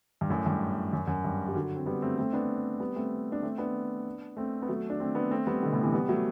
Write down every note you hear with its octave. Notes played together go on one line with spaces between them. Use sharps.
G2
F#2 A2
G2
F#2
F#2
G2
G3
D3 F#3
C4
G3 B3
A3 C4
A3 C4
B3 D4
G3 B3
A3 C4
D4
A3 C4
B3 D4
A3 C4
B3
F#3 A3
D4
A3 C4
B3 D4
A3 C4
G3 B3
B2 D3
A2 C3
C3 E3
G3 B3
F#3 A3